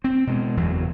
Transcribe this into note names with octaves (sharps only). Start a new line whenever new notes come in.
C4
B2 G#3
F#1 E2 E3 F#3